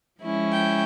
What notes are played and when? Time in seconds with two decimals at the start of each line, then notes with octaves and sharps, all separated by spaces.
0.21 F3 G#3 C#4 E4
0.51 G5